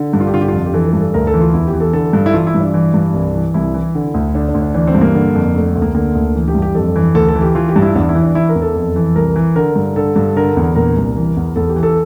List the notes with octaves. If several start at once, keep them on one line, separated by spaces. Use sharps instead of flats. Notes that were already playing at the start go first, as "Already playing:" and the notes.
Already playing: D3
G2
F4
G4
D3 F4
G4
F2 F4
G4
E3 A4
A4
G2
A4
D2 A#4
A4
E3
F4
E2 E4
G4
E3
A4
D3 A4
G2
E4
E3 F4
E4
G2
D4
E3
G2
C2
E3
C2 E4
E3
D3
D2
D3 D4
D4
D2
D4
E3 D4
C4
G2
A#3
D3
F2
D3 A3
A3
D2
A#3
D3 A#3
D2
E3
G4
G2
G4
F2 A4
E3
D2 A4
A4
E3
G4
E3 F4
G4
G2
E4
E2 D4
E4
E3
D4
E3 E4
A#4
E2
A4
F2
E3
C2 A#4
E3
D3 A#4
G2
D3 A4
G2
D3 A#4
E2
A#2 A#4
C2
E3
E2
E2 A4
G4
E3
A4